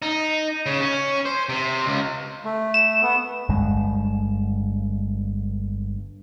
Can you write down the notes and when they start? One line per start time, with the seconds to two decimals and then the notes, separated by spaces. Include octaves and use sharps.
0.02 D#4
0.66 C#3
0.81 C#4
1.26 C5
1.49 C3
1.86 C#2
2.45 A3
2.74 E7
3.03 B3
3.49 G1 G2 G#3